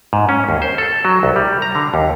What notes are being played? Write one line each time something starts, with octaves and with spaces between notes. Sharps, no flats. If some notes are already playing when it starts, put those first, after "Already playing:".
G#2
C#4
D#2
C5
A4
F#3
C2
G3
A#5
D3
D#2